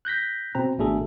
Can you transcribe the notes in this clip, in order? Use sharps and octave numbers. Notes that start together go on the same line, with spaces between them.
F#6 G6 A#6 B6
B2 C4 A#5
G#1 B2 A3 D4 G#4 A4